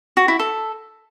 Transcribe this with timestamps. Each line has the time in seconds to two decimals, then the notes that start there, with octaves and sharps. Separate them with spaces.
0.17 F#4
0.28 E4
0.39 A4